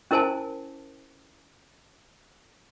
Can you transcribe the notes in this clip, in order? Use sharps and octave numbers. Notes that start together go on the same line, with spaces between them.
C#4 E4 A#4 C5 G#5 A5